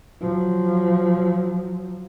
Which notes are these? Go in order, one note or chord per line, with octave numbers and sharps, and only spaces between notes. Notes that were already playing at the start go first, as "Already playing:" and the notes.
F3 F#3